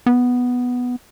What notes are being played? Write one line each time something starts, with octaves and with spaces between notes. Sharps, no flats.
B3